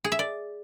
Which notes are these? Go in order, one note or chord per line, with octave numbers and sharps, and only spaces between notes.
G#4
E5
D5